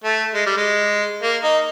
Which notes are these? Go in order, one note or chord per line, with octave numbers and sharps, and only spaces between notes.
A3
G#3
G3
G#3
A#3
D#4